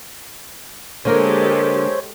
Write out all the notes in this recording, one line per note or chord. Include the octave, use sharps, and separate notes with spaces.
D3 G#3 A#3 G4 A4 A#4 C5 C#5